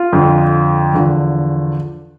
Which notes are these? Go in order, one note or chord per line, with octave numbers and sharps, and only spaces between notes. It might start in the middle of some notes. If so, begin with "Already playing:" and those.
Already playing: F4
F2 D3 F3
E2 D3 F3